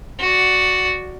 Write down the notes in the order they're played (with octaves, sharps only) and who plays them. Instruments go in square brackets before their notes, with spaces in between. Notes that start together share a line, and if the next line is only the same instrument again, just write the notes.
[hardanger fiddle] F#4 D5